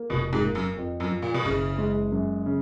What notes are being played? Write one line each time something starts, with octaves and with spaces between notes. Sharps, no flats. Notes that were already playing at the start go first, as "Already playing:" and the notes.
Already playing: A#3
F1 B2
G#2
A#3
F#2
F2
F#2
F3
A#2
B2
F#1 C#3
G#3
F#2
C#3